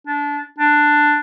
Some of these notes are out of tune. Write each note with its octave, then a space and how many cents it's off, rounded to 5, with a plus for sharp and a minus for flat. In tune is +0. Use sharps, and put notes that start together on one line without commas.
D4 -20
D4 +10